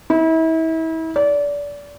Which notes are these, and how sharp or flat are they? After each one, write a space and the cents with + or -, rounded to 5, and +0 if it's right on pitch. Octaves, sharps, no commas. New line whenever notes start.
E4 -35
D5 -25